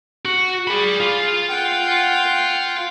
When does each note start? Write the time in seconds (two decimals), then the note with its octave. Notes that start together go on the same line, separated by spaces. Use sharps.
0.25 F#4
0.67 G#4 D5 B5
1.00 F4
1.49 F#5 G5